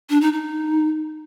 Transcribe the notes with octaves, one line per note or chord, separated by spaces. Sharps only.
D4
D#4
D#4